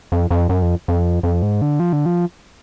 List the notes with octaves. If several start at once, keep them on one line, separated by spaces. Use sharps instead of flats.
F2
F2
F#2
F2
F2
F2
G#2
D3
F3
D3
F3